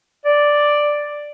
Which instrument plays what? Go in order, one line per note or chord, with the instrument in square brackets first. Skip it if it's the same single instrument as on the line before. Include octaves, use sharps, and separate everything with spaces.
[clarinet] D5